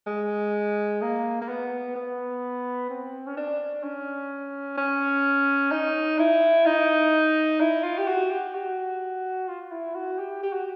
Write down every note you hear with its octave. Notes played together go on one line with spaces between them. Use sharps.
G#3
A#3
A#3
B3
B3
C4
C#4
D4
C#4
C#4
D#4
E4
D#4
E4
F4
G4
F#4
G4
F#4
F4
E4
F#4
G4
G4
F#4